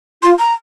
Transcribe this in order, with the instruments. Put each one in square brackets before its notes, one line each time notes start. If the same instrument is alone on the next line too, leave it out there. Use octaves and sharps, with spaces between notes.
[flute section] F4 [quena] C6
[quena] A#5